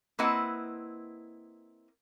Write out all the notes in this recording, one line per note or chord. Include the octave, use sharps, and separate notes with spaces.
A#3 C4 E4 B4 D#5 F#5